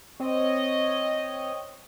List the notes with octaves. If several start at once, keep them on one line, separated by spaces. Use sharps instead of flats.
C4 C#5 D#5